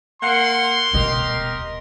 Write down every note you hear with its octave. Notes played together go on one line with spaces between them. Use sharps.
A#3 F#5 C6
D#1 B2 G4 A#4 D#5